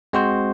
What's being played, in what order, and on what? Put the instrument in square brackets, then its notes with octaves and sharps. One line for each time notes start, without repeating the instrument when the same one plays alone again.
[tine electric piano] G#3 C4 F#4 C5